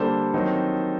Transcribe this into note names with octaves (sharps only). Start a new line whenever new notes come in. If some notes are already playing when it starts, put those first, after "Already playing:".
Already playing: D3 G3 A#3 D4 A4 C5
D#3 F#3 C4 D#4